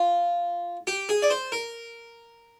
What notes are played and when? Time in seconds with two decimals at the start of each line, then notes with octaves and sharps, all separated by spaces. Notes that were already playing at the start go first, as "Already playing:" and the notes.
Already playing: F4
0.87 G4
1.09 G#4
1.22 D5
1.30 C5
1.52 A#4